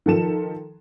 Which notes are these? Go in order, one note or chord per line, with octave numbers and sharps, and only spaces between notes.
D#3 F3 A4 E7